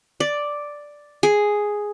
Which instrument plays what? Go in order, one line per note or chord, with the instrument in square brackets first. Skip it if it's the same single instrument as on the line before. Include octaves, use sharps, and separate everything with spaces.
[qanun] D5
G#4